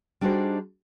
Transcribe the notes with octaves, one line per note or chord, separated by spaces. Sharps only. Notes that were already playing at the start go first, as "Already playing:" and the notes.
G3 D4 D#4 F#4 G#4 C5